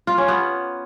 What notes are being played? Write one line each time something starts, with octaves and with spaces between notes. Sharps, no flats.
F4
C#4
B3